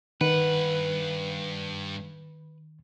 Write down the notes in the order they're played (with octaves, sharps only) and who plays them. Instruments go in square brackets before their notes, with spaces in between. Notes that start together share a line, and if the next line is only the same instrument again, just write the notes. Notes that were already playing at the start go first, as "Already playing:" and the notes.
[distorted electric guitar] G2 F#5 [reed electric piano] D#3 [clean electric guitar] B4